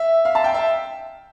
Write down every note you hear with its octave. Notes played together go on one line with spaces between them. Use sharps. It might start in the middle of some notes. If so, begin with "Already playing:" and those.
Already playing: E5
F5
A5
G5
E5